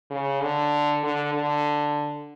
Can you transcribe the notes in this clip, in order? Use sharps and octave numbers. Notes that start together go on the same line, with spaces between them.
C#3
D3
D3
D3